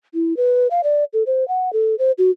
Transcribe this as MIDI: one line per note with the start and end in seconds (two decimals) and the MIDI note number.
0.14 0.36 64
0.37 0.67 71
0.71 0.81 77
0.84 1.04 74
1.13 1.23 69
1.26 1.47 72
1.48 1.72 78
1.73 1.95 69
1.99 2.11 72
2.18 2.31 66